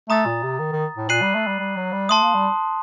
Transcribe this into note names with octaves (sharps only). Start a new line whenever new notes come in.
A3 A#5 D#6 A6
A#2
C3
D#3
D#3
A2
A#2 F#6 C7 D#7 F#7
G3
A3
G3
G3
F#3
G3
A3 A5 C6 D#6
A#3
G3